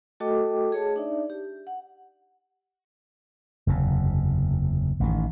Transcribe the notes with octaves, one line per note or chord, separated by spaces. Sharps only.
A3 F#4 A4 D#5 G5 D6
G#4 C#5 A5
D4 D#4 D5 E5
G4
F#5
F#1 E2 C3
A1 D#3